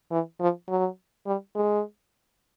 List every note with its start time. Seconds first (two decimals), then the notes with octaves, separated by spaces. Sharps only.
0.11 E3
0.41 F3
0.69 F#3
1.26 G3
1.55 G#3